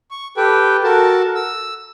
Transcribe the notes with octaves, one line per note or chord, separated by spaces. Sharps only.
C#6
G4 A4 B4 G5
F#4 A4 A#4 A5
E6